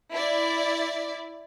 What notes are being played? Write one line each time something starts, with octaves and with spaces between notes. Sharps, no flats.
E4 D5